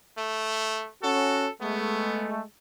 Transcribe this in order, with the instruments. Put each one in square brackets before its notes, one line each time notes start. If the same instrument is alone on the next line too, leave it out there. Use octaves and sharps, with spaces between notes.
[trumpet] A3
[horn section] C#4 F#4 [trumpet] A4
[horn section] G#3 A3 [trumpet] B3